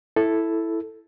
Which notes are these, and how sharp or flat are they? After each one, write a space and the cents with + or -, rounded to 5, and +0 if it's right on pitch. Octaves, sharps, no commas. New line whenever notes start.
E4 +0 A4 +0